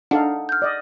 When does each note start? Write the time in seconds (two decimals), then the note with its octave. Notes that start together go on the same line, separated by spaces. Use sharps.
0.11 D4 D#4 A4 F5 F#5
0.49 F6 G6
0.62 D5 D#5